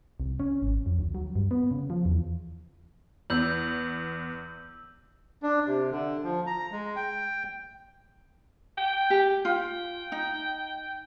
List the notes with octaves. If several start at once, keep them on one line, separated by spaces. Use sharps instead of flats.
C2
C#4
G#1
F2
D2
F#3
G2
B3
C#3
F3
E2
E2 E6 G6 F#7
D4
C3
D3
F3
A#5
G#3
G5
G5
G4
F4 G5
D#4